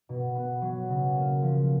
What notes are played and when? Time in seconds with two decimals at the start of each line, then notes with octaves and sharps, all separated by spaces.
0.09 B2
0.35 B3
0.62 F#3
0.89 C#3
1.16 A#3
1.42 F3